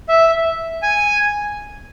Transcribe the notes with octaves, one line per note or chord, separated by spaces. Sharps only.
E5
G#5